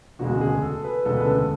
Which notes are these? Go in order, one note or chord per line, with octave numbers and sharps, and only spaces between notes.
E1 D2 C#3 G#3 F#4
F#4
G#4
A4
B4
E1 D2 C#3 G#3 A4
B4
A4